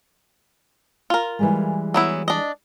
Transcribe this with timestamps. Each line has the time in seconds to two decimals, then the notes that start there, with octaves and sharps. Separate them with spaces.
1.10 F4 A#4
1.39 E3 G3 G#3
1.94 F#3 B3 E4
2.28 D4 D#5